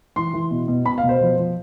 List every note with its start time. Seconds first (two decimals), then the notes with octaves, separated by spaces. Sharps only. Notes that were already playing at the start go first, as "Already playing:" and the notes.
0.16 E3 C6
0.34 E3
0.51 B2
0.68 B2
0.86 B2 B5
0.98 F5
1.03 B2
1.09 C5
1.21 F3
1.38 F3